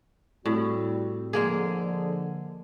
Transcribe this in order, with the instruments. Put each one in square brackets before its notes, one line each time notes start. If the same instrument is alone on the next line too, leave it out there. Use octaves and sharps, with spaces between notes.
[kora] A2 [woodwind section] G3 C4 F#4
[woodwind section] D3 F3 [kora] G#3 A#3 G#4